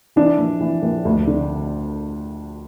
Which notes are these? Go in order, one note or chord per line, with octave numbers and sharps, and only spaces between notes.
E3 D4
A#1
E3
A#1
D2
D3